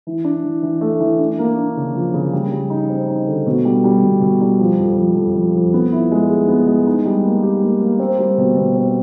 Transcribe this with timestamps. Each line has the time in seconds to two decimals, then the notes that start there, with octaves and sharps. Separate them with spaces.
0.07 E3
0.25 D4
0.44 E3
0.63 E3
0.81 A3
1.00 E3
1.19 D4
1.38 A#3
1.57 D4
1.77 C#3
1.95 F3
2.14 C#3
2.33 G3
2.52 G3
2.70 D#4
2.89 C4
3.08 D#4
3.27 D3
3.47 B2
3.65 G3
3.84 G3
4.03 B2
4.21 B2
4.41 G3
4.60 F3
4.78 F2
4.98 F3
5.16 F2
5.36 F3
5.55 F2
5.74 B3
5.92 E4
6.11 G#3
6.30 G#4
6.48 B3
6.67 G#3
6.86 D#4
7.05 G3
7.24 A#3
7.43 G4
7.63 A#3
7.81 A#3
8.00 C4
8.19 G3
8.38 B2
8.56 B2
8.76 C4